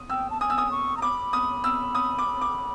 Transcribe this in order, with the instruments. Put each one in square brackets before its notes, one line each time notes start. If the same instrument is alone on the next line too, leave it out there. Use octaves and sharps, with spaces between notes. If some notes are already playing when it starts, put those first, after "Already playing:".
Already playing: [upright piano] D#6
[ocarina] G5 [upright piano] E6
[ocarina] A5
[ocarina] G#5 [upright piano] D#6
[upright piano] E6
D#6
[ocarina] C#6
A#5
[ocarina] B5 [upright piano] D6
[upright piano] D#6
E6
D#6
D6
D6